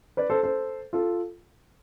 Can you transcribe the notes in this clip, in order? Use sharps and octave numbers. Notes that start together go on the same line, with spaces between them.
B4 D5
A4 C5
A4 C5
F4 A4